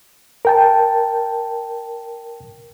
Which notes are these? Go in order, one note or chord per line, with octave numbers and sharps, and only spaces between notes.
A#4 G5 A5